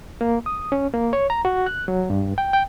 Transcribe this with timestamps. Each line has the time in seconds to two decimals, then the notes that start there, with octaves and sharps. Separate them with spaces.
0.21 A#3
0.46 D#6
0.72 C#4
0.94 A#3
1.13 C#5
1.30 A#5
1.45 F#4
1.66 F#6
1.88 F#3
2.10 G2
2.38 G5
2.53 G5